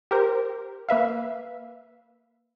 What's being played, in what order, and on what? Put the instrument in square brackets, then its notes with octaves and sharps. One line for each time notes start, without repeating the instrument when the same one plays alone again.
[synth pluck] G4 A#4 C5
A#3 B4 E5 F5